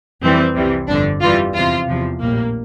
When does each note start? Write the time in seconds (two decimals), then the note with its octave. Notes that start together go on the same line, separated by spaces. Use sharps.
0.22 F2 E3 G3 C4
0.55 C2 C3 E3 G3
0.88 G1 F2 D3 D4
1.21 F2 E3 G3 F4
1.54 E2 C3 F3 F4
1.87 E2 C3 F3
2.20 A#1 A2 G3 A#3